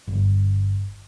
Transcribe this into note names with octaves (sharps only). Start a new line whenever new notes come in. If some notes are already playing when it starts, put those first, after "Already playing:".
G1